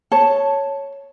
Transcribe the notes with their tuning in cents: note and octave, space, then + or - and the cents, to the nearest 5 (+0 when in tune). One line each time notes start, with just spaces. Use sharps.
C#5 +0 A5 +0